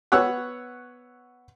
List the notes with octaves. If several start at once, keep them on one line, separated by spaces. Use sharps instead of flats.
B3 C#5 F#5 E6 F#6